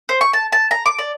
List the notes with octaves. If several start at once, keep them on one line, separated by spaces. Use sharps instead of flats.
C5
C#6
A5
A5
A#5
D6
D5